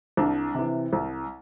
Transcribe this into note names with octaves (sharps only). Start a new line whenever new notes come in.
C2 D4
C3 E3
C2